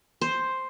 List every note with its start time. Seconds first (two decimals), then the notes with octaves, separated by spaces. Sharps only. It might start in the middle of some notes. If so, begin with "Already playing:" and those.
0.21 C5